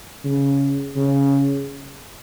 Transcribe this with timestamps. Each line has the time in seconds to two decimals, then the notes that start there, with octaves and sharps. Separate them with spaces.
0.25 C#3
0.96 C#3